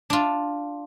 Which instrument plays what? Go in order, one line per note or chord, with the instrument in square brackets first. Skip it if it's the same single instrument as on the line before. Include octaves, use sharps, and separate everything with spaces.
[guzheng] D4 F4